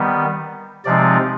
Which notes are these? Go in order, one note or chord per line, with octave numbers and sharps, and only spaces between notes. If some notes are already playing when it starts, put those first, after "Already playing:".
Already playing: D#3 G3 B3
C3 F3 G#3 C4 D#4 D5